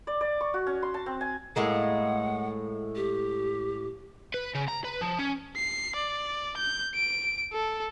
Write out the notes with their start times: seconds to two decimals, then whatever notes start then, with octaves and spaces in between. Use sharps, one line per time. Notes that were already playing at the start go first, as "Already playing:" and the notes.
0.07 D5
0.21 D5
0.41 C#6
0.54 F#4
0.67 C#4
0.83 C6
0.94 A5
1.06 C4
1.21 G#5
1.56 A2 G#3 A#3 F#5
2.96 G4
4.34 B4
4.55 C#3
4.68 A#5
4.84 B4
5.01 F3
5.18 C#4
5.56 C7
5.96 D5
6.57 G6
6.95 D7
7.53 A4